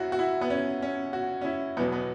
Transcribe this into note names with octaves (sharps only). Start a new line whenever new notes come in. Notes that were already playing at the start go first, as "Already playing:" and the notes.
Already playing: F#2 C#4 E4 F#4
F#4
E4
B3
C#4
C#4
F#4
C#4
E4
E2 B2 F#3 B3
B3